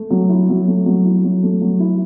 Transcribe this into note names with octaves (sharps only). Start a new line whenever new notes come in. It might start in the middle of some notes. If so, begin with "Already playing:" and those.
Already playing: A3
F#3
E4
F#3
A3
F#3
E4
F#3
A3
F#3
E4